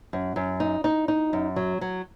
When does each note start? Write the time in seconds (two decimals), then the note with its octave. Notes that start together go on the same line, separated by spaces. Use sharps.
0.13 F#2
0.36 F#2
0.60 D#4
0.84 D#4
1.08 D#4
1.33 F#2
1.56 F#3
1.81 F#3